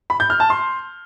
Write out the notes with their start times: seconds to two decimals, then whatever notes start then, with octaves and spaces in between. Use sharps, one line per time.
0.10 B5
0.20 G6
0.30 F6
0.40 A5
0.50 C6